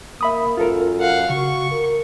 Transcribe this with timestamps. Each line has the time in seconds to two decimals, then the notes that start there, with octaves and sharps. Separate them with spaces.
0.21 A#3 E5 B5 D#6
0.57 F#2 F4 A4 A#4
1.00 F5 F#5
1.30 C#3 F#4 C#6
1.71 A#4